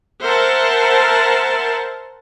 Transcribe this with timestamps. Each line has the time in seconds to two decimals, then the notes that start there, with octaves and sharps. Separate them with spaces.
0.24 A#4 C5 E5 F#5 A5